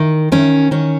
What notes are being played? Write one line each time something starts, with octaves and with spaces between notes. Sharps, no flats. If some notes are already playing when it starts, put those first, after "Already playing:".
Already playing: D#3
D#3 C#4
D#3 C#4